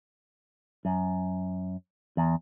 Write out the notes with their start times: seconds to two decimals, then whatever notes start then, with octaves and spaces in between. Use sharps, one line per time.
0.85 F#2
2.17 E2